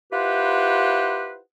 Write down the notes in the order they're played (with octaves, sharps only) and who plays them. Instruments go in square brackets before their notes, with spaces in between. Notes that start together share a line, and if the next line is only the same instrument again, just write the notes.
[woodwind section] E4 F4 G4 B4 C5 F#5